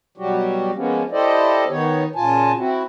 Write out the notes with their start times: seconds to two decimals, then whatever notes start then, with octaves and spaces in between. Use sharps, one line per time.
0.17 B2 F#3 G3 F#4 G4
0.75 F3 G#3 A#3 B3 C#4
1.12 E4 G4 A4 C5 D5 D#5
1.69 D#3 B3 D#4 C#5
2.16 A#2 C#3 F4 G#5 A5
2.57 C4 E4 F#4